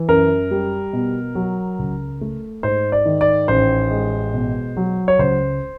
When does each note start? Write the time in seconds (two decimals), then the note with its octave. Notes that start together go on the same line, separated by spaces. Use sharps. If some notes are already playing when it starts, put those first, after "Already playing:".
Already playing: E3
0.08 F#2 A#4
0.51 G3
0.93 B2
1.35 F#3
1.79 C#2
2.21 A3
2.63 G#2 C5
2.92 D5
3.06 D#3
3.21 D5
3.48 A1 C5
3.91 G#3
4.34 B2
4.77 F#3
5.08 C#5
5.19 C#2 C5